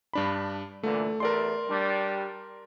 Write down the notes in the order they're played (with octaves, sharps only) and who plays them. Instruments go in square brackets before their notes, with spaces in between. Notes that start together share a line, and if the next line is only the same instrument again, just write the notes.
[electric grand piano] G2 D4 B5
[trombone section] A#2 D3 E3 [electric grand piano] A3
[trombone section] E2 A3 [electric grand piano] A#4 D5 C6
[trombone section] G3 D4